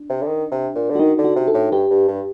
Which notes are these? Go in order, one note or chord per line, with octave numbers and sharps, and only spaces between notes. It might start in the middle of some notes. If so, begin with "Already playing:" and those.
Already playing: D4
C3
D3
D#3
C3
A#2
D3
F#4
D#3 D#4
D3
F#4
C3
A4
A2
G2 G4
G2
G2